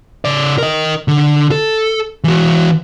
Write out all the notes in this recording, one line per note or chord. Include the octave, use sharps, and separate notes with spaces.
C#3 D5
A#4 D#5
D3
A4
E3 F#4